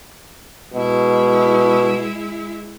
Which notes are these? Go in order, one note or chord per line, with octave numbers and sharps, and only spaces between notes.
B2 G#3 E4